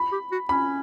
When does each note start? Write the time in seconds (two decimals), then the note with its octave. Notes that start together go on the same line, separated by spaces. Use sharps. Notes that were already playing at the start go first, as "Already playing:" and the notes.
Already playing: B5
0.12 G4
0.32 F#4
0.49 C#4 B5